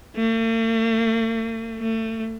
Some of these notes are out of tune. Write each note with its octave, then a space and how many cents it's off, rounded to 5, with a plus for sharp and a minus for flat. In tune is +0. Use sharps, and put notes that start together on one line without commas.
A3 +45
A3 +30